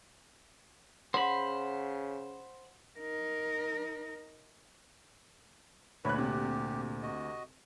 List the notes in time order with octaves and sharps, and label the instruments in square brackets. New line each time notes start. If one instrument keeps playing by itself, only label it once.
[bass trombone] C#3 [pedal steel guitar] C5 B5 [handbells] F#5
[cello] D#4 A#4
[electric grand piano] D2 [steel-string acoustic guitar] A#2 [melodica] E4 B4 [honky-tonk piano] C#5 F#6
[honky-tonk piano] C3 [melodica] G4
[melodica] F#4 D#5